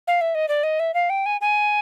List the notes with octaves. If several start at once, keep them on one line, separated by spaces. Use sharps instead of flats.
F5
E5
D#5
D5
D#5
E5
F5
G5
G#5
G#5